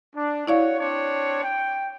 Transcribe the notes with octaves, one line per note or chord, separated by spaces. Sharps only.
D4
E4 F#4 C#5 D5 F5
C4 D4 C#5
G5